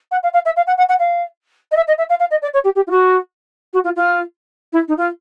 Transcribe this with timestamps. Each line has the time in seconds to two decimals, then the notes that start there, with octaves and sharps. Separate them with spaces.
0.11 F#5
0.23 F5
0.33 F5
0.45 E5
0.56 F5
0.67 F#5
0.77 F#5
0.89 F#5
0.99 F5
1.71 D#5
1.76 E5
1.87 D#5
1.98 E5
2.09 F5
2.19 F5
2.31 D#5
2.42 D5
2.53 C#5
2.64 G4
2.75 G4
2.87 F4
2.91 F#4
3.73 F#4
3.84 F4
3.96 F4
4.72 E4
4.88 D#4
4.97 F4